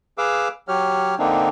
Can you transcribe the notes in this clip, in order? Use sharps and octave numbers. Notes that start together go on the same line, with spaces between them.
G#4 B4 F5 D6 E6
F#3 G4 C#5 F6
D3 A#3 C4 D4 D#4